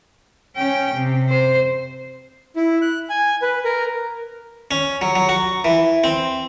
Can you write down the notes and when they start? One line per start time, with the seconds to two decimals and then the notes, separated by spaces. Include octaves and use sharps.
0.56 C#4 G5
0.94 C3
1.30 C5
2.56 E4
2.82 F#6
3.10 G#5
3.42 B4
3.65 A#4
4.71 C#4
5.02 F#3
5.15 F#3
5.29 F#4
5.64 E3
6.04 C4